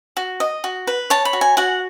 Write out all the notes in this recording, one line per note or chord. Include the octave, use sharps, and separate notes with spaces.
F#4
D#5
F#4
B4
C#5 A5
B5
F#4
G#5
F#4 F#5